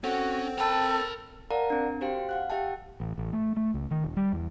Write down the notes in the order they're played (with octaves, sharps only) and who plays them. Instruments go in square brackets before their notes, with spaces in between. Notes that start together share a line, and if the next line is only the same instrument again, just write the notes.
[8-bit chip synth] C4 [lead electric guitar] C#4 [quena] F#4 [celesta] A4 F#5
[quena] A4 [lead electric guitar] A#4 B5 [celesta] G5 A5
[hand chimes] A#4 D5 F5 F#5 A5 A#5
C4 D4
F#4 G4 C5 F5 G5
F5 F#5 F#6
G4 E5 F#5 G5 A5
[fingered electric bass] A1
A1
A3
A3
C#2
D#3
E1
G3
E2